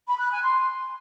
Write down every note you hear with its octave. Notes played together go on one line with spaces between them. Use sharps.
B5
F#6
G#5
C6